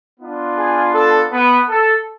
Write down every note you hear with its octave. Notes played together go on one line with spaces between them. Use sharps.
B3 D4 F4
G#4
A4
B3 B4
A4